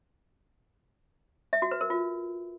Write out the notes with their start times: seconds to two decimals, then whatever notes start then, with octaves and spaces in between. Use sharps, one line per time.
1.53 E5
1.62 F#4
1.71 B4
1.81 A#4
1.90 F4